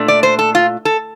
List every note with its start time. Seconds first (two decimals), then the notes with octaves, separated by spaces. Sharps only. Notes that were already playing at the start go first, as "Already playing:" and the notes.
Already playing: A#2 A3 D4
0.08 D5
0.23 C5
0.39 A4
0.55 F4
0.85 A4